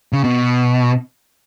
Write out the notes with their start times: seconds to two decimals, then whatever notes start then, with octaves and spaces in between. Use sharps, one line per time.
0.13 C#3
0.24 B2